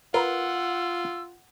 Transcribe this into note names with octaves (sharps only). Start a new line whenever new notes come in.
F4 A#4 B4 F#5 E6